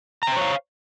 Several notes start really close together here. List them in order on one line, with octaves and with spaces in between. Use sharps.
A#5 G5 C5 C#5 F5